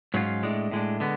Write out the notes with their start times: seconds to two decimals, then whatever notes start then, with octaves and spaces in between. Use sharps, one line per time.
0.14 G#2 F#3 C#4 F4
0.43 A2 G#3 D4
0.71 A2 G#3 D4
1.00 D3 G#3 B3